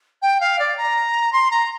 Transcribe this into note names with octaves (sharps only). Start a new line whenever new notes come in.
G5
F5
D5
A#5
C6
A#5